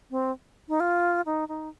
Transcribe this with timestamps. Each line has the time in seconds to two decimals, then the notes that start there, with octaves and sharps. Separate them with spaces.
0.11 C4
0.69 D#4
0.80 F4
1.26 D#4
1.48 D#4